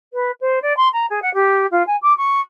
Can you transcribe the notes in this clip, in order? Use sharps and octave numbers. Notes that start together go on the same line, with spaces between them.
B4
C5
D5
C6
A#5
G#4
F#5
G4
F4
G#5
D6
C#6